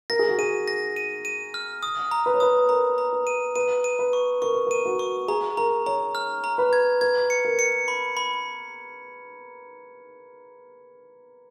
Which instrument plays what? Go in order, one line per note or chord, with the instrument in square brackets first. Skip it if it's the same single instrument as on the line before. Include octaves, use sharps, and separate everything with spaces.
[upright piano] A#4 [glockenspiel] A#6
[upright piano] G#4
F#4
[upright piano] G#4 [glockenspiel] D#7
[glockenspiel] A#6
D#7
D#7
F6
D#6
A#5
[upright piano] B4
C#5
[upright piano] B4 [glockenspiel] D#6
[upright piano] A#4 [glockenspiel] A#5
[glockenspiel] A#5
[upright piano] B4
[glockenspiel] D#7
[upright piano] B4 [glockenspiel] D#7
[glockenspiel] D#7
[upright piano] B4
[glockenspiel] C#6
[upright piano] A#4 [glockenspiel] C#6
[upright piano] B4
[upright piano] A#4 [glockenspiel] D#7
[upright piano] F#4
[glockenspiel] C#6
[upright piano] G#4 [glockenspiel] A#5
[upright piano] A#4 [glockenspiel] A#5
[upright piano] C#5 [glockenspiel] A#5
[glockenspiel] F6
A#5
[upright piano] B4
[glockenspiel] G#6
[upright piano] B4 [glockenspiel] G#6
[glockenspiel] C#7
[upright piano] A#4
[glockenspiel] C#7
B5
B5